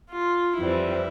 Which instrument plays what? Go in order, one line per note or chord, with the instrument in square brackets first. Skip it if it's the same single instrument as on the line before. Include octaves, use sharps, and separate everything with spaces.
[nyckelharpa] F4
[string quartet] F2 E3 G3 C4 [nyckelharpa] E4